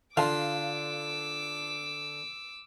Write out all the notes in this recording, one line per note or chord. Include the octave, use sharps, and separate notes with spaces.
D3 F4 F5 A5 D6 E6